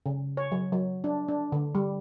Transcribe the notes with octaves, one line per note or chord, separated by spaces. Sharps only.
C#3
C#5
F#3
F#3
D4
D4
D3
G3